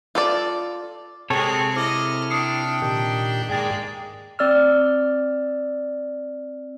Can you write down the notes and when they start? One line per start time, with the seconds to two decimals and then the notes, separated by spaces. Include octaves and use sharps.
0.15 F4 A4 D5
1.30 C3 G#3 C4 G#4 A4 C#5
1.76 E4 D#5 D6 F6
2.30 D4 G5 D#6 C7 C#7
2.82 A#2 D#3 G4
3.49 G#2 G#3 A#3 G#4 D5 G5 A6
4.39 C4 D5 E6 F6